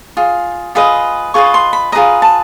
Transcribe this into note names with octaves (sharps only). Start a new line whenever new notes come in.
F4 G#4
F4 G#4 B4 D#5
F4 G#4 B4 D#5 C#6
C6
B5
F4 G#4 B4 D#5 A#5
A5